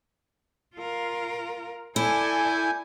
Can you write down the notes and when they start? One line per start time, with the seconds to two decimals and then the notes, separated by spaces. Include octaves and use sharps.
0.75 F4 A#4
1.96 E4 A4 D5 G#5 G6